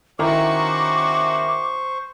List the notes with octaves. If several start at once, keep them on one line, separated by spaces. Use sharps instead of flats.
D#3 C#4 E4 F#4 C5 A#5 C#6 D6